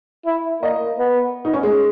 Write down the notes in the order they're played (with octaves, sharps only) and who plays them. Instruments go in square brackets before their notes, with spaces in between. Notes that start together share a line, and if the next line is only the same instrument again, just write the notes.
[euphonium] E4
[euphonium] A#3 [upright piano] D#5
[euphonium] B3
[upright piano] D#4
C#4
G#3